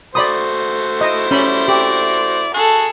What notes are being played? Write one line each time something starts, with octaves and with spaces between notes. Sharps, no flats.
A3 F#4 C5 D5 B5 D#6
E4 D#5
G3 C#4 B5
G4 D5
F#4 G#4 A4